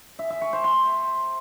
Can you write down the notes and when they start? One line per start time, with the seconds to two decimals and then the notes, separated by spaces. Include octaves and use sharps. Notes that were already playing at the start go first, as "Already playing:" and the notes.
0.19 E5
0.30 E5
0.41 C#6
0.53 C5
0.64 C6